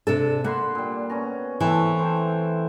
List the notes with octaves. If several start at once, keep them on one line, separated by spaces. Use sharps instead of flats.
C3 D4 A4
A#3 F#5 B5 C6
A#2 G3
B3 C#4 A#5
E3 A3 C4 A4
C5 G5